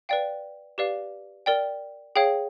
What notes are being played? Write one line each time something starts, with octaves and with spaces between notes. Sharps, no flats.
B4 D5 F5 G5
G4 B4 D5 F5
A#4 D5 G5
G#4 C#5 F5 G5